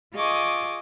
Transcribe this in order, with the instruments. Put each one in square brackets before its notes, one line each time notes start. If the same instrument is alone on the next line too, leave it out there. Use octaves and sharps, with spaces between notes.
[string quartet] F4 G#4 D#5 C#6 D6